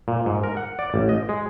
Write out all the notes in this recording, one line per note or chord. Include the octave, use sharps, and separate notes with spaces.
A#2
G#2
A#4
F#5
D5
A1
D#5
G#3